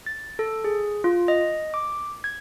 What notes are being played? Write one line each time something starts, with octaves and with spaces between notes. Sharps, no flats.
A6
A4
G#4
F4
D#5
D6
G#6